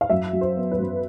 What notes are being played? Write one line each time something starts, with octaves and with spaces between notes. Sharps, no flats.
F5
F#2 E5
F#3
C5
B3
B4
F#2